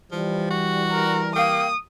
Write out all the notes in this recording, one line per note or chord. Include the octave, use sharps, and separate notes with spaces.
E3 F3 G3
F#4
A#4
A#3 F5 G5 D#6